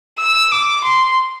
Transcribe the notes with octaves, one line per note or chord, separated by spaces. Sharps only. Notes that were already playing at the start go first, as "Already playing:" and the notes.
E6
D6
C6